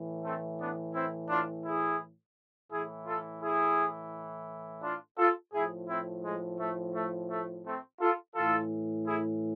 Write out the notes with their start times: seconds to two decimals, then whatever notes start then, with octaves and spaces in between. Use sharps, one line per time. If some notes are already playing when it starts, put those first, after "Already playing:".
Already playing: A2 E3
0.24 A3 C4
0.59 B3 D4
0.95 C4 E4
1.29 D4 F4
1.65 E4 G#4
2.71 A2 E3 E4 G#4
3.06 F4 A4
3.42 E4 G#4
4.82 D4 F4
5.18 F4 A4
5.53 A2 F3 E4 G#4
5.89 C4 E4
6.24 G#3
6.59 A3
6.94 A3
7.30 A3
7.65 A3 C4
8.00 F4 A4
8.35 A2 E3 F4 A4
9.06 E4 G#4